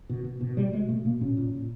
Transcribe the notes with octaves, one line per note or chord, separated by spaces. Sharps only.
B2
B2
B2
B2 G3
B2 G#3
B2 A3
B2 A#3
A#2 C#4
A#2
A#2